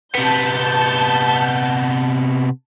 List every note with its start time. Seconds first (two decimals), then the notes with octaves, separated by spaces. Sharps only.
0.15 C3 B3 A5 G6